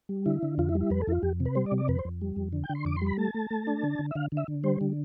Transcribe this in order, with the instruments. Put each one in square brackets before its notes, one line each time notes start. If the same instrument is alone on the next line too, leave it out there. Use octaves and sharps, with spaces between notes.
[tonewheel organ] G3
D3 E4
D3
F2 F4
E4
G3
E4
F2 B4
A4
F2 E4
F4
F2 G4
C3
B4
G3 C5
D5
C3
D5
F2 B4
C5
F2
G3
F2
D3
G5
D3
C6
F2 D6
C6
G3
B5
A3 A5
A3
A3
D4
D3
D3
E5
D3 F5
D3
E5
D3
G3 C5
D3